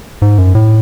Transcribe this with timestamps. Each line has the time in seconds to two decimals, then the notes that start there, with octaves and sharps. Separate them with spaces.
0.22 G#2
0.38 F#2
0.55 A2